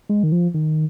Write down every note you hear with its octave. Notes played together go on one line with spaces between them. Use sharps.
G#3
D#3
F3
D#3